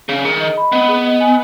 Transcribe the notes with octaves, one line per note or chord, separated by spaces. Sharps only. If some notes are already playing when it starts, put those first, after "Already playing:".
C#3 G#4
D#3 G#4
D#5
B5
B3 D#5
G#4
D#5
G#5